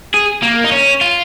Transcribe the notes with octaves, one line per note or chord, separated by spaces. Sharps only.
G#4
A#3
D#4
C#4
F4